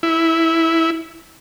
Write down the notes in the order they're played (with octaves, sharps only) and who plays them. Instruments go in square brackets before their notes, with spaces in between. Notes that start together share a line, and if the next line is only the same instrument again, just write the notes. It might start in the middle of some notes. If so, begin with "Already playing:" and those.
[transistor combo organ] E4